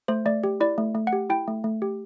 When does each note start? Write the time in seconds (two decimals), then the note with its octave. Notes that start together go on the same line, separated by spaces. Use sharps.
0.08 A3 C5
0.26 A3 D5
0.44 G4
0.60 E4 D5
0.78 A3
0.95 A3
1.07 F#5
1.13 G4
1.30 E4 G5
1.48 A3
1.64 A3
1.82 G4